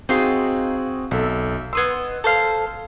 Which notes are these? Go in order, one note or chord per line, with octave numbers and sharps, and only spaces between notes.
C4 D#4 F4 F#4 G#4 C6
B1 A4 E5
B3 D#5 C6 E6 G#6
A4 C5 F5